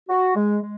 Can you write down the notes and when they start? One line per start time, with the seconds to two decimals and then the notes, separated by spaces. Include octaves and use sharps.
0.09 F#4
0.35 G#3
0.61 G#3